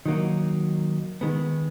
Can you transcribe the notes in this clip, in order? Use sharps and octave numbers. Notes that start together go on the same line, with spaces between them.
D#3 F#3 A#3 D#4
D#3 G#3 B3